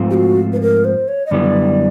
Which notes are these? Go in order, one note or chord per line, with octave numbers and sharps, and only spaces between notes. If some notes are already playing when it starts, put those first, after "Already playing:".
Already playing: G#2 F3 A3 C4 F4
G4
F#4
B4
A#4
C5
C#5
D#5
F#2 D3 G3 B3 E4 D5